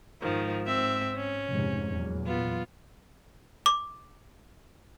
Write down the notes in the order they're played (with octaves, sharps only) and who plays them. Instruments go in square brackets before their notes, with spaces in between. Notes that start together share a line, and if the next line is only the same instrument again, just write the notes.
[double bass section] G#2 [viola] D#3 F3
[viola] C4 E5
C#4
[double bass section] F1 G#2 C3
E2 A#2 F#3
[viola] B3 F4
[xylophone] D6